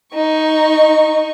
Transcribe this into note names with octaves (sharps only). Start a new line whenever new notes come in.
D#4 C#6